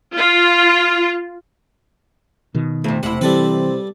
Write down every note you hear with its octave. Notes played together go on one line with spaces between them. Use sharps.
F4
B2 D#3
F2 C3 A3
E1 C3 A3 E4 F#5
E3 G3 C4 A4 B4